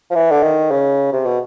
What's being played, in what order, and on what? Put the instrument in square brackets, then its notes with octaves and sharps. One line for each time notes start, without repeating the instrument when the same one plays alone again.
[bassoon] F3
E3
D3
D#3
C#3
C3
B2